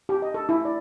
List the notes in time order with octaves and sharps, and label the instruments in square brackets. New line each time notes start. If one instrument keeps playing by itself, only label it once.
[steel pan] G4
D#5
A4
E4
D5